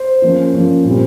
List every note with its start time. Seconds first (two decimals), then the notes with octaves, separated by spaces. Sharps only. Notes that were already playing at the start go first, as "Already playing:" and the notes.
Already playing: C5
0.22 F3 A#3 C#4
0.53 F3 A#3 C#4
0.84 A#2 G3 C4